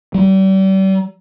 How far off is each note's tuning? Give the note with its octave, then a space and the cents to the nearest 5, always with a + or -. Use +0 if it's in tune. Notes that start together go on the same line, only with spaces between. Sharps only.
G3 -35